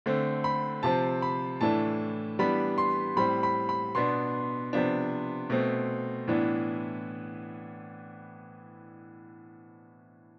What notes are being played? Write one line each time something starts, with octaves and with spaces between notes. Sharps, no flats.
D3 A3 C4
B5
C3 F3 C4 A5
B5
A2 E3 A3 D4 A5
E3 G3 B3 D4 B5
C6
A2 G3 C4 B5
B5
B5
B2 B3 D4 C6
C3 F3 B3 D4
B2 A3 C4
A2 E3 B3 D4